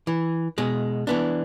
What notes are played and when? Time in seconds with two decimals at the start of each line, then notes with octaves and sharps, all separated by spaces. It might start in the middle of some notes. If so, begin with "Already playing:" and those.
0.07 E3
0.58 B2 G#3
1.07 E3 B3 D4